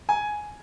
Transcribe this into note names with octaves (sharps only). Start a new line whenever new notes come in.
G#5